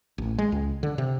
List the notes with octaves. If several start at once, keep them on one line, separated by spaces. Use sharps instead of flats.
A1
G#3
C#2
D3
C3